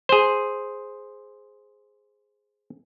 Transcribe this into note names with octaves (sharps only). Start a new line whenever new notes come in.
G#4 C5